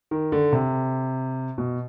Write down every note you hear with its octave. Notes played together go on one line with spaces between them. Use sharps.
D#3
D3
C3
B2